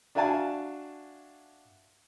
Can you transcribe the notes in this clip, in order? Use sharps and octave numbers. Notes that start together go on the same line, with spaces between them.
D4 F#4 E5 F5 G#5 A5